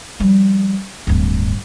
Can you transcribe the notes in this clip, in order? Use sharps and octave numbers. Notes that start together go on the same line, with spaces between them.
F3 G3
D1 G2